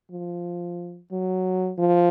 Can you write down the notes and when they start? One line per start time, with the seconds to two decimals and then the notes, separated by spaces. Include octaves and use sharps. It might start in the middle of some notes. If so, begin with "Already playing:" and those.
0.11 F3
1.12 F#3
1.79 F3